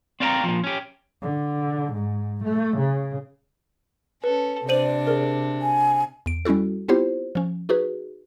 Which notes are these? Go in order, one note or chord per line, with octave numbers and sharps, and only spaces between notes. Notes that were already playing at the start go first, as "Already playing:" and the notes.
C4 D5 F5 G5 A5 A#5
A#2 F3
C#4 G4
D3
G#2
A3
C#3
C#4 A4 B4
C3 D4 C5 D5 D#7 F#7
G#4 A#4
G#5
E2 D7
G3 C#4 E4 F#4 A4
B3 C4 E4 F4 G4 C5
F3 C#4
D#4 F#4 G#4 B4